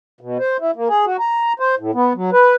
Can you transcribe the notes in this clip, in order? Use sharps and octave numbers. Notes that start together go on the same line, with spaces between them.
B2
C5
E4
A#3
G#4
F#4
A#5
C5
A2
B3
F#3
B4